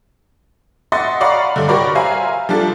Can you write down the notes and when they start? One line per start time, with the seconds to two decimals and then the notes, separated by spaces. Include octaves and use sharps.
0.92 D#5 E5 F#5 C6 A6
1.21 C#5 D5 F5 F#5 A#5 B5
1.56 G2 D3
1.68 F#4 G4 A#4 C#5 D5 B5
1.95 C5 E5 F5 G#5 A#5
2.49 F3 G3 D4 A4